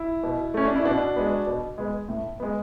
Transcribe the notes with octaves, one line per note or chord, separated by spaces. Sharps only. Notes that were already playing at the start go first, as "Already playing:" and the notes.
Already playing: E4
B2
A3 C#4
D4
E4
B2 D4 F#4
G#3 B3
B2
G#3 B3
A2
G#3 B3